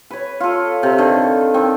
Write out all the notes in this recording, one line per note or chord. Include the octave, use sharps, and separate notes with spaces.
B4 C#5
F4 A4
C3
D3 D#3
D#3 C4